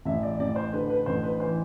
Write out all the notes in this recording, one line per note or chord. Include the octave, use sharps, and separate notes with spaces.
A1 E5
D5
A1 D5
C5
D3 B4
B4
A1 C5
B4
E3 C5